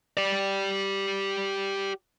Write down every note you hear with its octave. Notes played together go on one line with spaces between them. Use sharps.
G4 D5